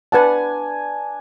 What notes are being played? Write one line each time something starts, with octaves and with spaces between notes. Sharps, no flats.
D4 B4 F#5 G#5 A5